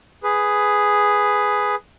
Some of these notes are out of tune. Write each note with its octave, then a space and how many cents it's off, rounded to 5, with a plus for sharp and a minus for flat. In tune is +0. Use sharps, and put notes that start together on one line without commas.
G#4 +0 B4 +10